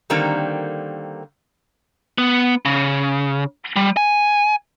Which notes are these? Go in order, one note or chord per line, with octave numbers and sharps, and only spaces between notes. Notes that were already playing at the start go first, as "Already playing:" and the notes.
D3 D#3 G3 A#3 C4
B3
C#3
G3
G#5